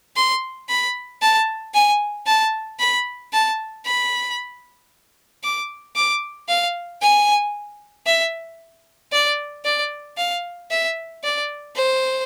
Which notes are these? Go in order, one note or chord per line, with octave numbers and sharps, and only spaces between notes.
C6
B5
A5
G#5
A5
B5
A5
B5
D6
D6
F5
G#5
E5
D5
D5
F5
E5
D5
C5